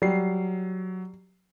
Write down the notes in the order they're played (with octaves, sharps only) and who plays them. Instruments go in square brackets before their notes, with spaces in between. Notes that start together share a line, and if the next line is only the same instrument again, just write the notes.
[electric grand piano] F#3 C7 [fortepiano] G3